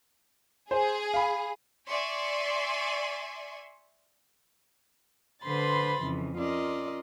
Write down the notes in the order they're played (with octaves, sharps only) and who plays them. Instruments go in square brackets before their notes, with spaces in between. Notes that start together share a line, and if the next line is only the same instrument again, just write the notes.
[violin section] G#4 [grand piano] C5
[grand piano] F5 B5
[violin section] D5 E5 G#5 C6 C#6
[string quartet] D3 B4 C5 B5 C6 A6
F2 C#3 E3
C#4 F4 A#4 D5 D#5